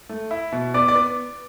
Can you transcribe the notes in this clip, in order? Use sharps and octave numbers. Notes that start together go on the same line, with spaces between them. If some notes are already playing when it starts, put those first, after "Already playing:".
A3
E4
B2
B3 D5 D6
D5 D6
B3